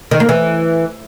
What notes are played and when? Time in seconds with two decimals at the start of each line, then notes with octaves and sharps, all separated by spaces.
0.11 D#3
0.20 A#3
0.29 E3